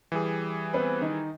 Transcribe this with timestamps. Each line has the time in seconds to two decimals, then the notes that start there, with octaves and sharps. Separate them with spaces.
0.12 E3 G3 G#4
0.73 B3 C4 B4
1.01 D#3 D#4